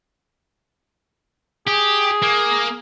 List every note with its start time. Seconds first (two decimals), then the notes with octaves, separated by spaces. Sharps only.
1.67 G4 G#4
2.22 A#3